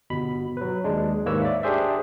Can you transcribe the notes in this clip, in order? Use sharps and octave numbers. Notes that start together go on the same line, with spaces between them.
G1 B2 B5
F#3 B4
D#2 G#3 D4
D#2 G#2 A#3 B4 C#5 E6
D5 E5
D4 G4 G#4 C5 E5